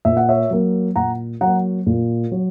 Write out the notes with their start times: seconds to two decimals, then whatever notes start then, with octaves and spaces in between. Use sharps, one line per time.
0.05 A#2 E5
0.17 F#5
0.29 C#5 E5
0.51 F#3 A#3
0.96 A#2 F#5 A#5
1.41 F#3 A#3 F#5 A#5
1.86 A#2
2.31 F#3